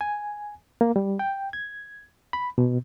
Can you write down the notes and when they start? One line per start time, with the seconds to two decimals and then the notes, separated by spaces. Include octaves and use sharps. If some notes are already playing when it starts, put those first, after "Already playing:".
0.01 G#5
0.81 A#3
0.96 G3
1.19 G5
1.53 G#6
2.33 B5
2.58 B2